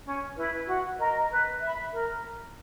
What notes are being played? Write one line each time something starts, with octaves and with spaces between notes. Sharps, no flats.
C#4
E4 B4
F#4
A#4 D#5
B4
E5 B5
A#4